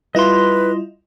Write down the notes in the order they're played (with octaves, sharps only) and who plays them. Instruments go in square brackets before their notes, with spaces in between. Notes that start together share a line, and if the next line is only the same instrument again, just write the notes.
[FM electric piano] G3 E4 F4 [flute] B4 [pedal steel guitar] D#5 C6